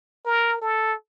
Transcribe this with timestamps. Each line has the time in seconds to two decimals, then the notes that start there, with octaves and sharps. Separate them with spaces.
0.26 A#4
0.62 A4